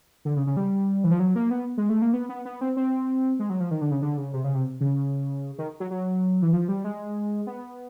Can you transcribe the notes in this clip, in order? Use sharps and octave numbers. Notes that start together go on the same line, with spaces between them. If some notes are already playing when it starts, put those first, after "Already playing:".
D3
C#3
C#3
G3
E3
F3
F#3
A#3
B3
G#3
A3
A#3
B3
B3
B3
C4
C4
G#3
F#3
F3
D#3
D3
C#3
D3
C#3
C3
C#3
C3
C#3
D#3
F#3
F#3
E3
F3
G3
G#3
B3